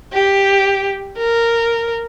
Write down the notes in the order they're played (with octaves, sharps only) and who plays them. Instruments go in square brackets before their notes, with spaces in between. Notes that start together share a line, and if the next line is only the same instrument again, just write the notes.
[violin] G4
A#4